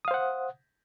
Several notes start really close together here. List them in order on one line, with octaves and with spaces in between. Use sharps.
D#6 F5 C5 F#5